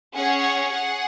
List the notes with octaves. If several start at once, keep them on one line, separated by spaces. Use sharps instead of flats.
C#4 G#4 C#5 F#5
G#4 F#5